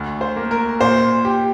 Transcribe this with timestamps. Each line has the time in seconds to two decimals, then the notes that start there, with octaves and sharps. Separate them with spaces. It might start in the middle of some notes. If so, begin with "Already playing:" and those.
Already playing: D2
0.21 C5
0.36 A#3
0.51 A#4
0.81 A#2 C5
1.25 G4